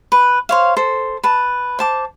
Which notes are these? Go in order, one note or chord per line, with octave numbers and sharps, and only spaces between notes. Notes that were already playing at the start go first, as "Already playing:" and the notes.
B4
C5 C#5 F5
A4 C5
B4 A5
C5 A5 D6